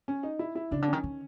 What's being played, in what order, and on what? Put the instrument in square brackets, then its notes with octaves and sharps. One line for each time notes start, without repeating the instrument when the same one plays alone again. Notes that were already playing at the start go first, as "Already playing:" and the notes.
[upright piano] C#4
D#4
E4
E4
[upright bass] C#3 [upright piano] D4
[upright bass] D3
[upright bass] D#3 [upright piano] C#4
[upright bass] D#3